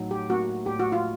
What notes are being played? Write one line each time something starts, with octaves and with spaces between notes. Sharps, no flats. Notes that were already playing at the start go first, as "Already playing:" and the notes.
Already playing: A2 F#3 D#4
G4
A#3 F#4
A2 G4
F#4
F4